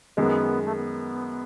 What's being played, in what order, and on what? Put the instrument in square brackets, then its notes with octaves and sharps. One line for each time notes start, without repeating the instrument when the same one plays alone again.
[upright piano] F#2 D#3 G#3 [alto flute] B3
[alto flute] A3
B3